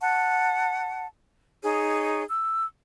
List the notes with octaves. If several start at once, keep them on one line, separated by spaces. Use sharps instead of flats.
F#5 A5
D#4 G#4 C#5
E6